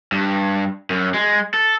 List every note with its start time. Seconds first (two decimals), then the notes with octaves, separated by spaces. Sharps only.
0.12 G2
0.90 F#2
1.14 G#3
1.54 A4